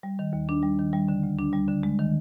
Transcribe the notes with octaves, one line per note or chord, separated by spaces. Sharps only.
G3
D#3
D#2
D4
G3
D#3
G3
D3
D2
D4
G3
D3
G#3
D#3